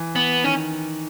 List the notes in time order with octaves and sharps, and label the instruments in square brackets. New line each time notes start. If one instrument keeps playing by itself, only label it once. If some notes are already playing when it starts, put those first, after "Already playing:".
Already playing: [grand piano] E3
[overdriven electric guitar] B3
[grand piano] D#3 [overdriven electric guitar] C#4